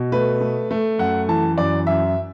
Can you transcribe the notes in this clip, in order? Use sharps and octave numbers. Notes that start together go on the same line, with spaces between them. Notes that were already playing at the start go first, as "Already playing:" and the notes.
Already playing: B2
A3 B4
A3
A3
F#2 F#5
E3 A5
F#2 D5
F#2 E5